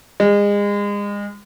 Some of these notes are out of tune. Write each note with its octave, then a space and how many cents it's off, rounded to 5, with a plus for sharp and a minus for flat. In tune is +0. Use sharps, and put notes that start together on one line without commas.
G#3 -30